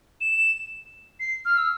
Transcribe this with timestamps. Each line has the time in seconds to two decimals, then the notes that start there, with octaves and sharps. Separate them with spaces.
0.21 E7
1.20 C7
1.45 F6
1.57 E6